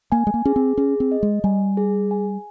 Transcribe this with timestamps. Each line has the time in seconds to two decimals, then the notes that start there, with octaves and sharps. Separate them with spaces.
0.12 A#3 G#5
0.27 G#3
0.34 A#3
0.45 C#4 G#4
0.56 C4
0.77 C#4 G#4
1.00 C4
1.12 D#5
1.23 G#3
1.44 G3 G#5
1.77 G#4
2.11 G#5